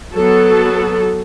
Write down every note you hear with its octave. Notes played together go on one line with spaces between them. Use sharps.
F#3 B3 A4